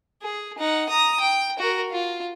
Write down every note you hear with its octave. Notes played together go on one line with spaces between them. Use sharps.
G#4
D#4 F#5
A#5 D#6
G5
F#4 A#4
F4